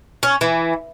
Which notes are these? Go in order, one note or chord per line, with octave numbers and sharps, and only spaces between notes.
C#4
E3